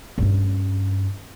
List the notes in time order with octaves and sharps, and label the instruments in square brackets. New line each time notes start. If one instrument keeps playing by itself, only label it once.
[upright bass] G2 C#4